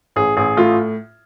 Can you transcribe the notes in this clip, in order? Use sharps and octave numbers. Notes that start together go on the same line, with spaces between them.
A1 G#4
A1 G#4
A2 F4